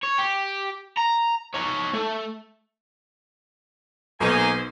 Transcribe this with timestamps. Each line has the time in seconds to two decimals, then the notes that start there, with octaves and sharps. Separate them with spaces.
0.03 C#5
0.18 G4
0.97 A#5
1.54 D#4 C#5
1.94 A3
4.21 B1 A#3 D#4 C5 G#5